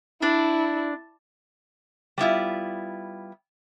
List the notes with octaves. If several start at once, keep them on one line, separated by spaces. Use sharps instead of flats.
D4 E4
G3 B3 E4 F4